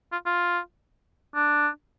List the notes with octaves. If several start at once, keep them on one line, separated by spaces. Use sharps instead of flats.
F4
F4
D4